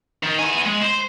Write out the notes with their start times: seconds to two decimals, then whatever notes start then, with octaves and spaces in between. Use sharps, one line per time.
0.23 D#3
0.39 B3 G#5
0.66 G#3
0.82 C5